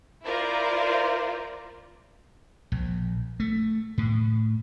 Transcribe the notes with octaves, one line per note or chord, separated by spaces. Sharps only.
E4 F4 A#4 C5 D5
A#1
A3
A2